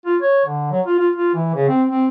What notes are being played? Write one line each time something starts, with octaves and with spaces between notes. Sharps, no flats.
F4
C#5
D3
F#3
F4
F4
F4
E3
C#3
C4
C4